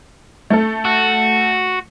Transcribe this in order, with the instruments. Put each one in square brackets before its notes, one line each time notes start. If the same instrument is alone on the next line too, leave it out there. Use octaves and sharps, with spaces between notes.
[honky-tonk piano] A3 A4
[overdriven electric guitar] F#4